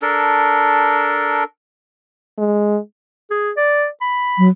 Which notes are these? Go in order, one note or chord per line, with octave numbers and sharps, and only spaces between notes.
D4 A4 A#4
G#3
G#4
D5
B5
F#3